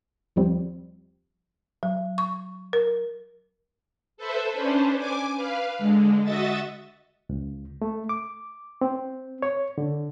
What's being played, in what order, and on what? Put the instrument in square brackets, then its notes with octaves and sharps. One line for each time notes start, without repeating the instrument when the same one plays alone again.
[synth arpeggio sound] D#2 F3 G3 C4
[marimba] F#3
C#6
A#4
[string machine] A4 B4 C5 E5
C#4 D4 B4 C5
G#5 D6
B4 F5
D3 G#3
F#4 D#5 E5 A6
[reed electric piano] C#2
A3
D6
C4
C#5
D3